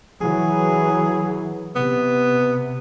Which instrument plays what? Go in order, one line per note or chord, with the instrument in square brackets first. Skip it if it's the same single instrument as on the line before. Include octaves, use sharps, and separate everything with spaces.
[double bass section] E3 F#3 [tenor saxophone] G#4
[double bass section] C3 [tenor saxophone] B3